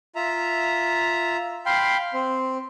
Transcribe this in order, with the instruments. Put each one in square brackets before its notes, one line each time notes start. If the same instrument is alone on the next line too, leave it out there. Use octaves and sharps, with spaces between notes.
[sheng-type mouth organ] F4 E5 A#5
F5 G5 B5 C6
C4